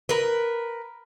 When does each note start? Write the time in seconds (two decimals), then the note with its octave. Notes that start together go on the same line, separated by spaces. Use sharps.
0.09 A#4 B4